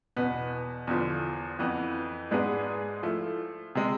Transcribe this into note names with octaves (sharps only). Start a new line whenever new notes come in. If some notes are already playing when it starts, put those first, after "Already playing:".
E2 B2 B3
E2 D3 F3
F2 E3 B3
G#2 G#3 B3 D4 G#4
F3 A3 E4
C3 G#3